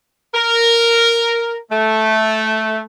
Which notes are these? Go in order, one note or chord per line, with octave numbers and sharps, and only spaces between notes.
A#4
A3